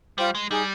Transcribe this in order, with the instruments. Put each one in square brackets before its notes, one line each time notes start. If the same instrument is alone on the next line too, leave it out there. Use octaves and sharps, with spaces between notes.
[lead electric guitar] G3 [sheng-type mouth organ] F4 C5 G5
[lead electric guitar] G#3
[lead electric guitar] G3 [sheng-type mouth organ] D#4 G#4 D#5 G#5